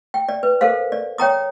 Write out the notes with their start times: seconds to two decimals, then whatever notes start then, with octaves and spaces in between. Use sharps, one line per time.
0.14 G5
0.29 D5
0.43 B4
0.61 A4 A#4 C5 F5
0.92 D5
1.18 C#5 G5 A#5 D#6